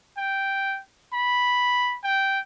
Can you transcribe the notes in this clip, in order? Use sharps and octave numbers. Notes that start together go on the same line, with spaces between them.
G5
B5
G5